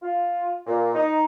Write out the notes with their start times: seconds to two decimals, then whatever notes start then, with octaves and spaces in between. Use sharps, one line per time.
0.02 F4
0.66 A#2
0.94 D#4